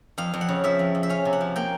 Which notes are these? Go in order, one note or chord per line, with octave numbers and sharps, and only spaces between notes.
F2 F5
F2
F#5
C#3
F3 E5
F2
F2
E5
C#4 F5
C3
F#5
F3
A#3 G5